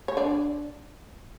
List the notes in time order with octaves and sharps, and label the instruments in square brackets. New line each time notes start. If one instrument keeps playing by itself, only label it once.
[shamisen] C#5
D4 D5